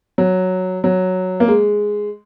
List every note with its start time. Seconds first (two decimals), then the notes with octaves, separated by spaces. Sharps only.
0.18 F#3
0.84 F#3
1.40 A#3
1.48 G#3